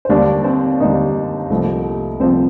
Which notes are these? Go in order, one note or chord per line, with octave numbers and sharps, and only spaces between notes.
C5
D#2 D3 G3 A#3 D4 D5
C4 C5
D#2 D3 G3 A#3 D#4
C2 C3 F3 A3
C2 C3 F3 A3 C4 C5